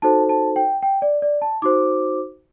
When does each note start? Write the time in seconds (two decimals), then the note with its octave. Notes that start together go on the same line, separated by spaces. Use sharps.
0.02 D#4 F#4 A4 C5 A5
0.29 A5
0.56 G5
0.83 G5
1.02 D5
1.22 D5
1.42 A5
1.62 D#4 F#4 C5 D6